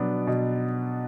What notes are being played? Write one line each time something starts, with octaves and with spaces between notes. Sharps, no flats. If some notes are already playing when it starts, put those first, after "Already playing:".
Already playing: B2 F#3 B3 D4 D5
B2